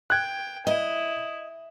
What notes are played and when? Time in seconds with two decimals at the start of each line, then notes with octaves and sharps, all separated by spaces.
0.10 G5 F#6 G#6
0.67 E4 D#5